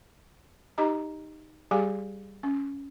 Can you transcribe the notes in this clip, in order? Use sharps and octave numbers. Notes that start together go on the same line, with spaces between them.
D#4 G4 D#5 A#5
G3 G4 G#4 F5 G#5
C#4